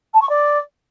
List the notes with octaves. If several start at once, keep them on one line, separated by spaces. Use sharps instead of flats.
A5
C#6
D5